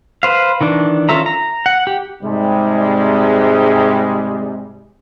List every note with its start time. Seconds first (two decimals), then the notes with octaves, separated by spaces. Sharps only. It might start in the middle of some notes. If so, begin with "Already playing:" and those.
0.23 B4 C5 F5
0.61 D#3 E3 D4
1.09 C#4 F4 A4 E5 A#5
1.26 A#5
1.66 F#5
1.87 G4
2.23 G#2 C3 G3 G#3